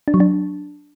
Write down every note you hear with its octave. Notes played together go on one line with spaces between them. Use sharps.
D4
F#3
D4